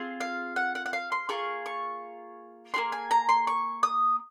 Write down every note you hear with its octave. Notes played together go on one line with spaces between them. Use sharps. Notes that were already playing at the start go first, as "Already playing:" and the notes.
Already playing: C4 F4 G#4
F5
F#5
F#5
F#5
F5
C6
A#3 F4 G#4 C#6
C#6
A#3 F4 G#4 C6
G#5
A#5
C6
C#6
D#6